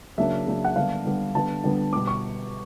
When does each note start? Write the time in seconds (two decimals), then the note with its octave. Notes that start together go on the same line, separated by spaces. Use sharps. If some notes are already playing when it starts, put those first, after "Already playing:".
0.18 C#3 F#3 A#3 D4 E5
0.46 C#3 F#3 A#3 D4
0.65 F#5
0.76 D3 G3 B3 D4 F5
1.05 D3 G3 B3 D4
1.35 D3 G3 B3 D4 A5
1.64 D3 G3 B3 D4
1.92 B2 G3 B3 D6
2.07 C#6